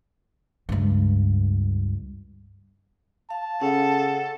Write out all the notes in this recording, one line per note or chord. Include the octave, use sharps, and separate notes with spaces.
C#2 G2
F5 A5
C#3 C#4 A4 F#5